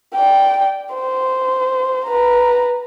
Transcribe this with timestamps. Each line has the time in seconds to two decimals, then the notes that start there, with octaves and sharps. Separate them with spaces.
0.15 D5 G5
0.94 C5
2.07 B4 A#5